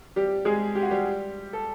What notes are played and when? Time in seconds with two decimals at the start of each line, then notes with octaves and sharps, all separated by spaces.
0.16 G3 G4
0.45 G#3 G#4
0.75 G4
0.83 F#4
0.91 G3 G4
1.53 A4